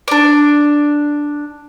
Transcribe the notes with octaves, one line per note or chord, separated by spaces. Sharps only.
D4 D5